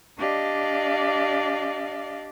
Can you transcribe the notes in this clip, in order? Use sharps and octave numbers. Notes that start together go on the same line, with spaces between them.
D4 G4 D5 D#5 F5